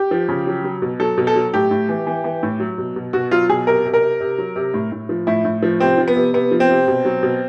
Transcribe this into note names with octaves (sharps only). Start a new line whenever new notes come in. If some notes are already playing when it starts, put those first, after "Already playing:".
Already playing: G4
F3
C#3
F#3
F#3
B2
F#3 A4
B2
A4
F#3
A2 G4
A2
E3
E3
E3
A2
F#3
B2
B2
B2 F#4
F#3 F4
B2 G#4
C3 A#4
C3
A#4
C3
C3
F#3
C3
A2
A2
F3
A2 E4
A2
F3
C3 C4
F3
B3
C3
C3 B3
F3
C4
C3
B2
F#3
B2